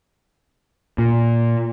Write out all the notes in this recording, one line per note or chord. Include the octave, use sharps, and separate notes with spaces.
A#2